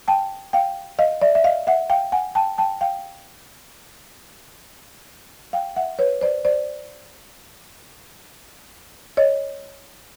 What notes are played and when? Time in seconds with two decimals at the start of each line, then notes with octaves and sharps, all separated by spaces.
0.08 G5 A5
0.53 F5 G5
0.99 D#5 F5
1.21 D5 E5
1.35 E5
1.44 D#5 F5
1.67 E5 F#5
1.90 F5 G5
2.12 F#5 G#5
2.35 G5 A5
2.58 G5 A5
2.81 F5 G5
5.53 F5 G5
5.76 E5 F#5
5.99 B4 C#5
6.21 C5 D5
6.45 C5 D5
9.17 C#5 D#5